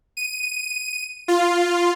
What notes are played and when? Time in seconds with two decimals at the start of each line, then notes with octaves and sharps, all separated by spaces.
0.17 D#7
1.28 F4